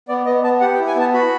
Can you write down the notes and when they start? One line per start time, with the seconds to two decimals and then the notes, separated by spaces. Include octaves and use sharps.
0.08 B3 D5
0.26 B3 D#5
0.43 B3 A5
0.61 G4 F#5
0.75 G5
0.79 E4
0.87 G#5
0.95 B3 A5
1.14 F#4 B5